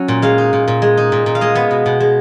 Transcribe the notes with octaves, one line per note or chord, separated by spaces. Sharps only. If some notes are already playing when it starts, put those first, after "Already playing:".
Already playing: F#3 C#4
A#2
G#3 F5
D#4
A#2
A#2
G#3
D#4
A#2
A#2
F5
G#3 D#5
B3
B2
B2
G#3